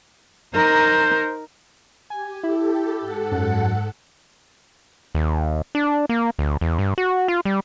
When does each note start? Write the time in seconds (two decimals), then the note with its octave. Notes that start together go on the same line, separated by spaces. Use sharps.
0.54 D#4 A#4 C5
2.10 G4 G#5
2.43 E4 G4 A4
3.00 G#2 A4 F#5
3.32 F#2
5.15 D#2
5.75 D4
6.09 A#3
6.39 D2
6.61 E2
6.79 G2
6.98 F#4
7.28 F4
7.45 G3